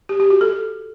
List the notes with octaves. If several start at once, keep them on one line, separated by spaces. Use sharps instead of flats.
G4
G4
F#4
A4